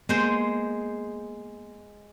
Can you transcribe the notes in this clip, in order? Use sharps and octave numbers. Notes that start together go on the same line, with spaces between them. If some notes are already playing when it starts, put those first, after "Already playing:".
G#3 A#3 B3 C5